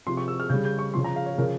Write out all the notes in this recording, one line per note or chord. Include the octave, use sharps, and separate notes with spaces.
C3 F3 C6
C#6
E6
F6
C#3 G3 G6
G6
C#6
C#3 F3 C6
A#5
F5
C#5
C#3 F3 A#4